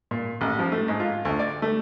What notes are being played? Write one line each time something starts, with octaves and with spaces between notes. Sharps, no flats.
A#2
A1
F3
A3
G#2
F4
D2
D5
A3